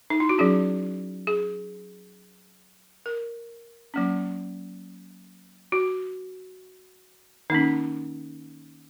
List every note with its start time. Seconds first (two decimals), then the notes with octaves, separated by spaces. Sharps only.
0.10 D#4
0.20 E4
0.29 F#4
0.38 F#3 C#4 G#4
1.27 G#4
3.06 A#4
3.94 F#3 A#3 C#4
5.72 F#4
7.50 D#3 A#3 C#4 D#4